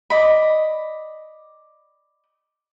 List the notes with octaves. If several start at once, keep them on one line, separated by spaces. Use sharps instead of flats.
D5 D#5 B5